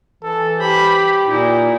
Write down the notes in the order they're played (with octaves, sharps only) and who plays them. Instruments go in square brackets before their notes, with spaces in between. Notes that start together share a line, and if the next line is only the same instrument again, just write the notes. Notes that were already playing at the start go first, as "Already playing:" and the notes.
[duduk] E3 [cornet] A4
[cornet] G4 [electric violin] C5 B5
[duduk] A#2 [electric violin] D#4 E4